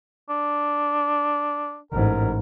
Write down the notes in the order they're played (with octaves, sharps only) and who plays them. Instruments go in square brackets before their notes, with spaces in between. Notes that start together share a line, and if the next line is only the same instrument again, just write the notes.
[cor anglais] D4
[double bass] A1 G#2 [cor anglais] A#4